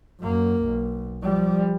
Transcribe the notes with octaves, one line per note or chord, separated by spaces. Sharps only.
F#2 A#3
B1
F3 G3